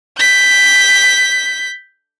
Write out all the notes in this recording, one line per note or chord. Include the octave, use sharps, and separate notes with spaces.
G6 B6